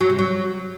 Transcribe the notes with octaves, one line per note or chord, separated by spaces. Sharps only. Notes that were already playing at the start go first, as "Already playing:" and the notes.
F#3
C3
F#3